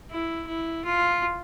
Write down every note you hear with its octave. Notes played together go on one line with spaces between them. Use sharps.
E4
E4
F4